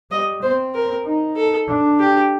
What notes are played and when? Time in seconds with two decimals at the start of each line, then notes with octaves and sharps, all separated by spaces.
0.11 G3 D#5
0.42 C4 C5
0.74 A#4
1.05 D#4
1.36 A4
1.67 D4
2.00 G4